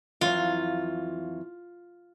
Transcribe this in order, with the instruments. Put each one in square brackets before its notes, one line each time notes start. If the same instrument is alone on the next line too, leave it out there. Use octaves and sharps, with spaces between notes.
[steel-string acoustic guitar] F2 E3 F#3 [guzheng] F4